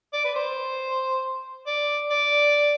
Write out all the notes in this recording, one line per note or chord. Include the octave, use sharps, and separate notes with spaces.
D5
B4
C5
D5
D5